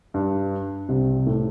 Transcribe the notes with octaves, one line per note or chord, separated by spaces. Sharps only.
G2
C2 C3
A2 A3